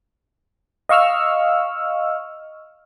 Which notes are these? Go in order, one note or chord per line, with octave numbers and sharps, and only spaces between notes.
D#5 F5 C#6 E6 F6